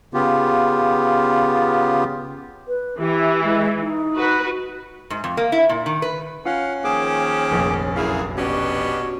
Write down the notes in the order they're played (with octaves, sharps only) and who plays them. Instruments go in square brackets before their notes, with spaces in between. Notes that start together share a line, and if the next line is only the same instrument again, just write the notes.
[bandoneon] C#3 B3 F4 G4
[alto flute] B4
[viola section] E3 [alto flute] G4
[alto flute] G#3
D#4
[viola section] F#4 B4
[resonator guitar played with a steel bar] G#2
F2
A#3
E4
A#2
D#3
B4
[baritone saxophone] C#4 [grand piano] F4 [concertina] F5 F#5
[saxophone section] D#3 F3 A#3 [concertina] G#4 D6
[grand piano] F1 A#1
[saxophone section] F#2 G#4 [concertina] E4 F5
[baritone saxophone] B2 [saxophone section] C#4 D4 G4 [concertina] F#4 C#5